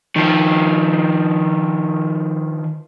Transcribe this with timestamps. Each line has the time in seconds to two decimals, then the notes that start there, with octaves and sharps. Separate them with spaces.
0.16 D#3 F3